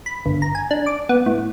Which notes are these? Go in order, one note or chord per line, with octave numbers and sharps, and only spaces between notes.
B5
G1
A#5
G#5
D4
D6
B3
A2